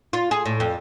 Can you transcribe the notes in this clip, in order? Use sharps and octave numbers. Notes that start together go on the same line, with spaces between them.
F4
G#4
A2
F2